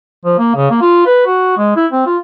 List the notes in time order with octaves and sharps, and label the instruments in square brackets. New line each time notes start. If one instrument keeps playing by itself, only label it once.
[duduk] F3
A#3
C#3
A#3
F4
B4
F#4
G#3
E4
C4
F4